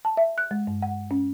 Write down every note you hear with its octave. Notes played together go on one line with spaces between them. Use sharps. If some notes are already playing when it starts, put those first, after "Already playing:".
A5
E5
F#6
G#3
G2
F#5
C#4